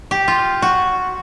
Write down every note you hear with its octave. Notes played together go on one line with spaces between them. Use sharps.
G4
F4
F#4